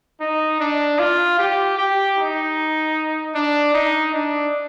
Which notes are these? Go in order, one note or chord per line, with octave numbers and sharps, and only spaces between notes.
D#4
D4
F4
G4
G4
D#4
D4
D#4
D4